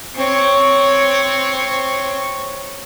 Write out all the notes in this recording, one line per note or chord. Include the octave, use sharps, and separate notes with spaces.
C4 C#5